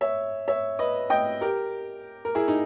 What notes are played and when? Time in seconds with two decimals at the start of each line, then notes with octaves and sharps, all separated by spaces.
0.01 C#5 E5
0.48 C#5 E5
0.79 B4 D#5
1.10 D#5 G5
1.41 G4 A#4
2.25 A#4
2.35 E4 G#4
2.48 D#4